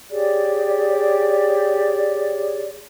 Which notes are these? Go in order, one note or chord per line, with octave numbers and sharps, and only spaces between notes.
G4 G#4 C#5 D5